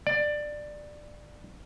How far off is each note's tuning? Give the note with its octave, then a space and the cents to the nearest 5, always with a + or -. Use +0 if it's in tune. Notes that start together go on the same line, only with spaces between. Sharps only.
D5 +15